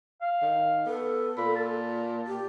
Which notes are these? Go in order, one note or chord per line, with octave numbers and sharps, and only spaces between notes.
F5
D#3
B3 A4
A#2 B5
A5
G4